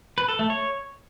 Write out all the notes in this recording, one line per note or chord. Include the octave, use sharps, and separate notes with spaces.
B4
A4
A3
C#5